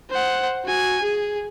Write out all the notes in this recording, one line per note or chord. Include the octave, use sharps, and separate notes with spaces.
C5 F#5
F#4 G#5
G#4